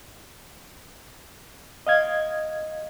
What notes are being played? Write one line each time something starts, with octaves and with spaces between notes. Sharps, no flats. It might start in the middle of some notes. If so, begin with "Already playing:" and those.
D#5 F5 G#6